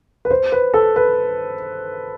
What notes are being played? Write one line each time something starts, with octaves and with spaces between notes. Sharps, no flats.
B4
C5
B4
A4
B4